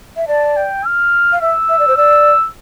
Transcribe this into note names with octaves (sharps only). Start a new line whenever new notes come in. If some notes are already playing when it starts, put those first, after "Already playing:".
E5
D5 A5
G5
F6
F5
E5 E6
E5
D5
C5
D5 E6